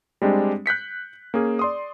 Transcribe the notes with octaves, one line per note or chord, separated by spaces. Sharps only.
G3 G#3 C4 D4 G4
F#6 G6 B6 C#7
A#3 C#4 G#4
D5 C6 D#6